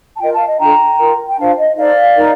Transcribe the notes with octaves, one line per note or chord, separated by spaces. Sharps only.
A5
F4 A#4 D#5 G5
F5 A5
D#5
D4 F4 A4 G5 A#5
F4 A#4
G5
D4 F4 C5 F5 A5
D#5
D#4 A4 C5 D5 F5
D#4 A#4